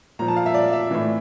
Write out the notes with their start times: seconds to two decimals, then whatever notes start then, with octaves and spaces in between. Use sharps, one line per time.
0.19 A#2 F3 A#5
0.28 A5
0.36 F5
0.46 E5
0.54 D5
0.73 E5
0.91 A2 E3